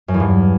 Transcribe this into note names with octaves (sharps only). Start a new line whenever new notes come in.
F#2
E2
G2